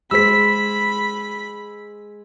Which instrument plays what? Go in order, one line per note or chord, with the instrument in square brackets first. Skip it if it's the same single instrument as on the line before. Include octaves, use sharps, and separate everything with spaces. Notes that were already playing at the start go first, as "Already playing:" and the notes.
[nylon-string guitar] G#3 G#4 C5 [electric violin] B5 [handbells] E6 B6